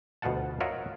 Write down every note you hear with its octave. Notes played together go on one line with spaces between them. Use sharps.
D2 B2 F3 F4 F#5 A5
F4 A#4 C#5 D#5 E5 F#5